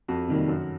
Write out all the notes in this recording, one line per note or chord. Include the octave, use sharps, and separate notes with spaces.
F2 F#4
C3 D#3 G3 A#3
F#2